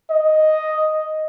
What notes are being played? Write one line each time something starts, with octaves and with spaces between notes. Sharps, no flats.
D#5